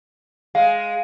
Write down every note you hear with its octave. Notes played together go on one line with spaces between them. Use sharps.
G#3 F5